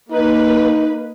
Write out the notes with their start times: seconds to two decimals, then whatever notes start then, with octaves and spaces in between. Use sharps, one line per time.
0.12 A#3 D#4 B4